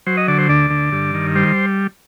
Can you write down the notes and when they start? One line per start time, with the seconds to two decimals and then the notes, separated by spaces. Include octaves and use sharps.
0.06 F#3 C5
0.17 D#5
0.28 D3 D5
0.38 C5
0.49 D2 D5
0.70 D3
0.92 G2
1.14 D#3
1.35 G3 C5